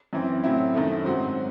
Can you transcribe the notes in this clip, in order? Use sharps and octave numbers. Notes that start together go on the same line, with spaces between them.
F#2 E3 C4
A2 F#3 C4 E4
F#2 D#3 A3
G#2 F#3 C4 F#4 C5